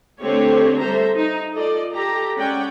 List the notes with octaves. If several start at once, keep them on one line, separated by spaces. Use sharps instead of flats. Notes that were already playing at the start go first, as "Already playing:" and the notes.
D3 A3 C4 G4 C#5
G3 A4 C5 E5 A#5
D#4
F4 A4 D5 D#5
G4 A4 A#5
G#3 C#4 D5 F#5 G5